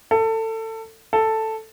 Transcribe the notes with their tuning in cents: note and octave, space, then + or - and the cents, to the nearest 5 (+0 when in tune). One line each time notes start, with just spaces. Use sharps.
A4 +25
A4 +5